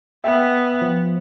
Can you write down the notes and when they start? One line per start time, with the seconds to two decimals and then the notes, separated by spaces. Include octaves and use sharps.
0.24 B3 E5 G5
0.82 F3